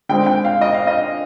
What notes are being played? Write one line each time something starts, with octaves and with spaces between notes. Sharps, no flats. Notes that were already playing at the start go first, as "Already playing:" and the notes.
D3 G#3 C4 G5
G5
F5
D#5
F5
D#5